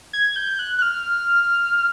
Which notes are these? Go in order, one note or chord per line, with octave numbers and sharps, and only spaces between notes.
G#6
G6
F#6
F#6
F6